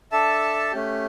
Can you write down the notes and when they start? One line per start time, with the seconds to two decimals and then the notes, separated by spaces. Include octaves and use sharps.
0.12 D4 A4 E5 A5
0.72 A3 C#4 G4